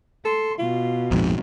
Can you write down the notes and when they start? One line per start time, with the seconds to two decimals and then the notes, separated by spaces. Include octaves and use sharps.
0.25 A4 C6
0.59 B2 F4
1.11 A#1 F2 G#2